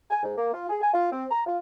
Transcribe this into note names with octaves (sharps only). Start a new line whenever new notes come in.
G#5
G#2
A#3
F4
G#4
G#5
F4
C4
A#5
F4